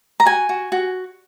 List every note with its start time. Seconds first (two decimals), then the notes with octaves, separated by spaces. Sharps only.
0.20 A#5
0.26 F#4 G#5
0.49 F#4
0.72 F#4